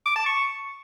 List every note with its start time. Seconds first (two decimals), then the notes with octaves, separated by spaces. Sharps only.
0.06 D6
0.16 A5
0.26 C#6